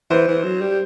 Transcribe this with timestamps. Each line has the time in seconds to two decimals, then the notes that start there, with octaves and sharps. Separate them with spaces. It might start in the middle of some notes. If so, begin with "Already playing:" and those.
0.10 E3 C5
0.28 E3
0.44 F#3
0.61 G3